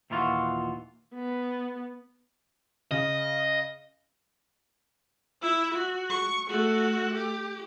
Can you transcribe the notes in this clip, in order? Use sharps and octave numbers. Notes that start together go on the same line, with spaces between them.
D#2 A#2 E3 F4 F#4
B3
C#3 D#5
E4 E5
F#4
C#6
A3 F#4
G4